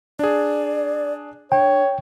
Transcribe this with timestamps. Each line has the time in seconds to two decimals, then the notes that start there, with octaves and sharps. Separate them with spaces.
0.19 D4 G#4 D5
1.52 D4 C#5 G5